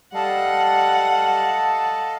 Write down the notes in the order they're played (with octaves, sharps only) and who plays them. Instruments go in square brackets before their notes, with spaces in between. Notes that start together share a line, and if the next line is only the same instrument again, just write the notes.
[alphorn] G3 [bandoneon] A4 D#5 F5 [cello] F#5 [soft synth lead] A5